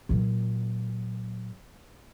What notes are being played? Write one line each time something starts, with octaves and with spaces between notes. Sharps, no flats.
A#2 F#3